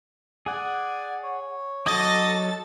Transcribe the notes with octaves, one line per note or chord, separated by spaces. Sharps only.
G#4 D5 F#5 G#5
C#5
F#3 A4 D#5 D6 A6